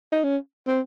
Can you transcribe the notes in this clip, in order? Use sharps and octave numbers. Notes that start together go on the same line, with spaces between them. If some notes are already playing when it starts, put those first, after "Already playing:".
D#4
C#4
C4